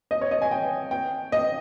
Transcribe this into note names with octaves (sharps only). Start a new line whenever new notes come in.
D#5
C#5
D#5
G#5
G5
G5
D#5